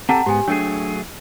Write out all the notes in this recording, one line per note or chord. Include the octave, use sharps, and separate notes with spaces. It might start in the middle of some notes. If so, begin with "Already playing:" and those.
C4 G4 A4 F#5 A5 A#5
G#2 B3 G4 G#5
F#3 A3 D4 G#4